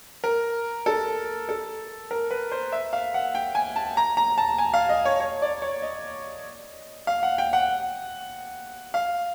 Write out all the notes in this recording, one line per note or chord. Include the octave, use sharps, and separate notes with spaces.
A#4
A4
A4
A#4
B4
C5
E5
F5
F#5
G5
G#5
A5
A#5
A#5
A5
G#5
F5
D#5
C#5
C#5
D5
C#5
D#5
F5
F#5
G5
F#5
F5